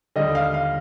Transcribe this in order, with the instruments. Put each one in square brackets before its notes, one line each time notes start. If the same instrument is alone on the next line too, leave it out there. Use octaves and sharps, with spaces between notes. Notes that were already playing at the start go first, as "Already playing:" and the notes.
[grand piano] D#2 D3 G3 D#5
F5
F5